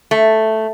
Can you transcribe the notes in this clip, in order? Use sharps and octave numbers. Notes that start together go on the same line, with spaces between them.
A3